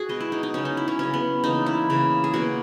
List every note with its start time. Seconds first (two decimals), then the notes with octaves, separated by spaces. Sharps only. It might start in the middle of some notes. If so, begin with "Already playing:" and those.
Already playing: F#4 G#4
0.09 B2 G#3 B3 D#5
0.20 E4
0.32 D#4
0.43 D#4
0.54 C#3 F#3 B3 C#4
0.65 D#4
0.77 E4
0.88 C#4
0.99 C#3 F#3 B3 C#4
1.14 B3
1.44 C#3 E3 A#3 D#4
1.66 E4
1.90 C#3 E3 A#3
2.24 G#4
2.34 B2 A#3 F#4